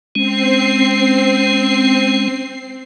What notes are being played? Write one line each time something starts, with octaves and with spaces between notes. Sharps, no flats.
G#3 C4 C#4 C7